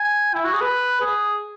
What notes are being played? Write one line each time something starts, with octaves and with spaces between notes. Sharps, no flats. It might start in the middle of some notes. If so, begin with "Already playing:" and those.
Already playing: G#5
E4
F#4
G#4
B4
G#4